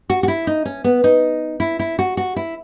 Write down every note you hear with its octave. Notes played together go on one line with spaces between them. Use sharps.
F#4
F#4
E4
D#4
C#4
B3
D#4
E4
E4
F#4
F#4
E4